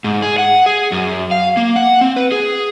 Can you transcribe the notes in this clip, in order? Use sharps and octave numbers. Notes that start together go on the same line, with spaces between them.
G#2
G#4
F#5
G#4
F#2
F5
A#3
F#5
C4
B4
G#4